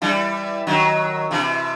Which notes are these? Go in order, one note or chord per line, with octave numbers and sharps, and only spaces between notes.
E3 G3
D#3 F#3
C3 E3